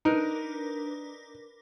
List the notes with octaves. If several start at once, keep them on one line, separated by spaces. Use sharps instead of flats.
D4 D#4 A#4 B4